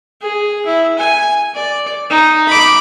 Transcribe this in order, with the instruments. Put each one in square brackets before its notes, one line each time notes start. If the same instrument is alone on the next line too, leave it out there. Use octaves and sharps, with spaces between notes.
[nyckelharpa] G#4
E4
G#5
D5
D#4
B5 D6